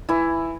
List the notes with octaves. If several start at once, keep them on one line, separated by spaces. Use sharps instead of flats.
E3 E4